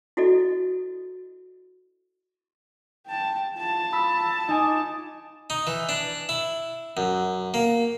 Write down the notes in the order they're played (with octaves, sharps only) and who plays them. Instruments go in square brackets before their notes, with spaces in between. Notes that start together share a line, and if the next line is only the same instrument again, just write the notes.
[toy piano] E4 F#4 A4 D5 D#5
[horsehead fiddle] G5 A5
F4 A5
[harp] B5 E6
D#4 G#5 D6
[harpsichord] D#4
E3
D4
E4
F#2
A#3